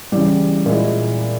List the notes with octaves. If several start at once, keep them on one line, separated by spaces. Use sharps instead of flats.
C#3 E3 G3
A#2 G#3 E4